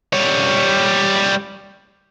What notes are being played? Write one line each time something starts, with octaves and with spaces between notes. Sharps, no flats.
G3 C#5